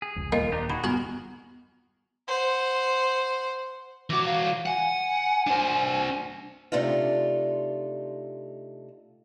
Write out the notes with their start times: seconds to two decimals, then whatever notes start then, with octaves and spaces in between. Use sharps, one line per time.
0.02 G#4
0.16 F1 C#2
0.32 D#1 A#3 F4 D#5
0.52 D4 D#4 G4
0.70 D#3 F#4 G#4 B5
0.84 B3 F#4 A#4 C6
2.28 C5 F#5
4.10 E3 F#4 D6
4.25 F5
4.66 F#5 G#5
5.47 D4 C5
6.72 C3 A3 D4 D#4 F4